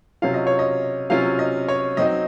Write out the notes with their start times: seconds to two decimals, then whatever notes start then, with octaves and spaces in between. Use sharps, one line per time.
0.22 C3 F#3 C#4 F4 F5
0.34 D#5
0.47 C#5
0.59 D#5
1.10 C3 F#3 C#4 F4 F5
1.39 D#5
1.68 C#5
1.97 F#3 C4 D#4 D#5